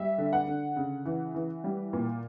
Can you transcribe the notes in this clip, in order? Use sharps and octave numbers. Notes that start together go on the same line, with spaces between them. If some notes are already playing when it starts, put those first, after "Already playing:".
Already playing: G3 E5
D3
F#5
D3
C#3
E3
E3
G3
A#2